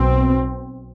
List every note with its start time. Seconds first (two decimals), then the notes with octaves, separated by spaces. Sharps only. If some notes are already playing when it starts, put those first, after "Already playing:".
Already playing: B1 B2 C4